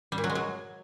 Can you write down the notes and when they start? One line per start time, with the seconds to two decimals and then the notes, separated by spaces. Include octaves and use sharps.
0.12 G3
0.18 A#2
0.24 F#3
0.30 G#3
0.35 F#3